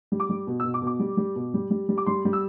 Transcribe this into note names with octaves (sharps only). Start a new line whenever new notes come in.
G3
D6
G3
B2
E6
B2
D6
B2
D6
G3
G3
B2
G3
G3
G3
D6
G3 C6
G3
E6